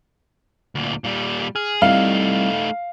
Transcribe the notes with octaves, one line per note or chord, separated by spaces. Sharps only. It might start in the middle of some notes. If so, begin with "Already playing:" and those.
D2 A#2
A#2 G3
G#4 F6
G3 A3 C4 D#4 E4 F5